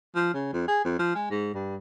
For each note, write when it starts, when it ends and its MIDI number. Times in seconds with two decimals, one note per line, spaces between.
0.16 0.32 53
0.34 0.49 49
0.53 0.66 41
0.68 0.83 68
0.85 0.95 41
0.99 1.13 53
1.15 1.30 56
1.31 1.52 44
1.54 1.76 43